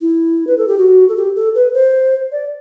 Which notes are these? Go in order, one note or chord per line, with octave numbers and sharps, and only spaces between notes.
E4
B4
A4
G4
F#4
A4
G4
A4
B4
C5
D5